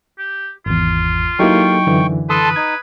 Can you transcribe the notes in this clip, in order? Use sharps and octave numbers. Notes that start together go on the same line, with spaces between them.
G4
G#1 E2 F4
F#3 A#3 D#4 E4 G4 A4 G5 C#6
F#2 D3 E3
A4 B4 A5 C6 D#6
D#4 G#6